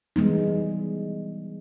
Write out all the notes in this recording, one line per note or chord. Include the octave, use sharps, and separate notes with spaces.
E3 G3 G#3 B3 D#4